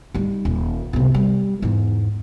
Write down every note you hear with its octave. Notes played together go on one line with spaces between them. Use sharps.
G3 D#4
D#1
B1 C3
G3
E2 G#2